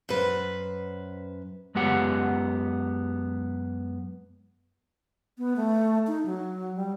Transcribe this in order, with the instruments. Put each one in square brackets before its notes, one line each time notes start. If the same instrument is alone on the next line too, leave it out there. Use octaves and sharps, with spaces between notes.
[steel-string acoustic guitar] F#2 B4 C5
[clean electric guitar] F#2 G#3 B3 G4 F#5
[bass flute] B3
A3
D#4
F#3
G3